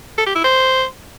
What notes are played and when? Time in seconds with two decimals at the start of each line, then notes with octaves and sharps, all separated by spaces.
0.18 A4
0.27 G4
0.35 E4
0.44 C5